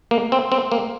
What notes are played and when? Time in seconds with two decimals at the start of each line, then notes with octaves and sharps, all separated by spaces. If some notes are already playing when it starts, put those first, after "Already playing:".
0.11 A#3
0.32 C4
0.52 C4
0.72 A#3